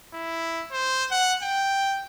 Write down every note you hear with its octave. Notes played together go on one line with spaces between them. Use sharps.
E4
C5
F#5
G5